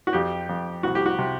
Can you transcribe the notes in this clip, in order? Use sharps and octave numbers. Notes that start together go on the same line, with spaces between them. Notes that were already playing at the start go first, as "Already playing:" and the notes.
F#4
F2 G4
F2
C2 F#4
G4
F#4
C3